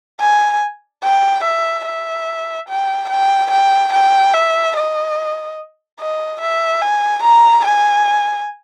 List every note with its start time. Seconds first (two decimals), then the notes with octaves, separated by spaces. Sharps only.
0.20 G#5
1.03 G5
1.44 E5
1.86 E5
2.69 G5
3.10 G5
3.51 G5
3.93 G5
4.33 E5
4.76 D#5
6.00 D#5
6.41 E5
6.81 G#5
7.23 A#5
7.65 G#5